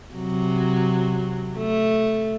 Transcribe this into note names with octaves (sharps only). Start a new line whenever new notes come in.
C3 F#3
A3